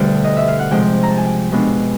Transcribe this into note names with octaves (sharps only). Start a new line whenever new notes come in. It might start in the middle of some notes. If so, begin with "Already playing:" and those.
Already playing: D2 B2 D3 G3 E4 G5
D#5
E5
F5
F#5
C3 F3 G#3 G5
A#5
A5
G#5
G5
B2 G#3 B3 D4